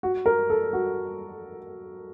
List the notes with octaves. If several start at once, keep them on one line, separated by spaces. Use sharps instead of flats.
F#4
A#4
A4
F#4